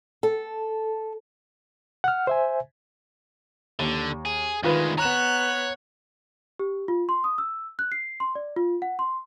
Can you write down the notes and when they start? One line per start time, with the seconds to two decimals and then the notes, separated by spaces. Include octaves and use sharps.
0.23 A4
2.04 F#5 F6
2.27 C5 E5 G#5
3.79 D#2 D3
4.26 G#4
4.63 D2 D#3 G#3 F4 B4
4.98 B3 C#5 A#5 F#6 E7
6.59 G4
6.88 F4
7.09 C6
7.24 D#6
7.38 E6
7.79 F#6
7.92 C7
8.20 C6
8.35 D5
8.56 F4
8.82 F#5
8.99 C6